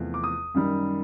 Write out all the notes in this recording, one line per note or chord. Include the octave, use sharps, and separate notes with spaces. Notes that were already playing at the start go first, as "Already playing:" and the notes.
Already playing: E2 C3 F3 A3
D6
D#6
F#2 D#3 G3